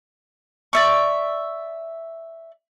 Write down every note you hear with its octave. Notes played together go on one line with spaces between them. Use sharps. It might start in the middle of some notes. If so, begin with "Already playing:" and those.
D5 E5 C#6